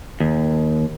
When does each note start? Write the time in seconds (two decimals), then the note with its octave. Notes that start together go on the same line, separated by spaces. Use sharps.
0.20 D#2